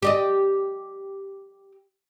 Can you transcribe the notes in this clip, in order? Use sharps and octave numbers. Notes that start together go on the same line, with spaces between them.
G4 D5 D#5